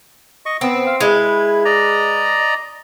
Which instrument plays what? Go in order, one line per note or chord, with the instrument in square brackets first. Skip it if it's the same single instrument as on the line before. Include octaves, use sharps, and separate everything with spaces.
[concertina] D#5 C#6
[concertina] B3 [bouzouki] C4
[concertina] F5
[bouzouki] G#3 B4 [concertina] E4
[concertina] D5 D#5 A#5